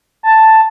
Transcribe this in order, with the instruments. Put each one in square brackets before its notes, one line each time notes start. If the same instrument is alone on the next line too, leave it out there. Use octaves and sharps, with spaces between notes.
[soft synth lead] A5